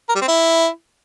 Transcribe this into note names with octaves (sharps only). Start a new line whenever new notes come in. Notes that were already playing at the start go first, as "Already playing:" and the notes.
A#4
G3
C4
E4